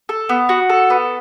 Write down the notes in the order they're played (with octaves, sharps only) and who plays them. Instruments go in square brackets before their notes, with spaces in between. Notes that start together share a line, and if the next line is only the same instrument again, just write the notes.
[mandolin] A4
B3
F#4
A4
B3